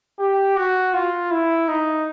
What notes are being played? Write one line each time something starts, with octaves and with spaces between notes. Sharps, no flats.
G4
F#4
F4
E4
D#4